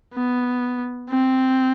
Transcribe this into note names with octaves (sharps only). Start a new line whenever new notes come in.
B3
C4